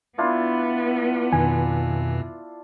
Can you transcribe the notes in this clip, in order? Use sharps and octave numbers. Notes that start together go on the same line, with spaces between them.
B3 D4 E4 F4
F2 B2 D#3 G#5